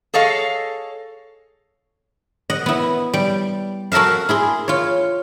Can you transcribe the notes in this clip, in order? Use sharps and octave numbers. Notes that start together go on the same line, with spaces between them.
G#4 A4 C#5 D#5 F5
D#5 F#5
B3 E4
G3
F#4 A4 A#4 E5 F5
E4 G#4 C6
F4 C#5